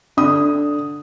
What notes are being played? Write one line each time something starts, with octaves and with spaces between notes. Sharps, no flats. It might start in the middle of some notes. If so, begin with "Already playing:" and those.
D3 D#6